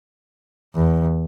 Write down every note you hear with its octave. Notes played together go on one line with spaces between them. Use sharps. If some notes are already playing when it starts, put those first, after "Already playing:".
E2